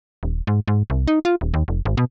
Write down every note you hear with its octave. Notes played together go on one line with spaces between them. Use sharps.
D#1
G#2
G#2
C2
D#4
F4
D#1
D#2
F1
G#1
B2